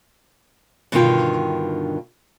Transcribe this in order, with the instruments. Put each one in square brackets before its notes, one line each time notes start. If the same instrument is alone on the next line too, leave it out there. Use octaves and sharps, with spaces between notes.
[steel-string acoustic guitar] G2 B2 D3 D#3 F4 G5